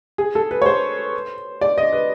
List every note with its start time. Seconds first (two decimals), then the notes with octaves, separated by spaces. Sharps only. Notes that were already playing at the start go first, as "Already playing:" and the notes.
0.18 G#4
0.35 A4
0.51 B4
0.62 C#5
0.66 C5
1.61 D5
1.78 D#5
1.93 B4